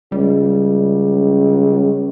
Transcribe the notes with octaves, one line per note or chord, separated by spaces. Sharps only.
C#2 G3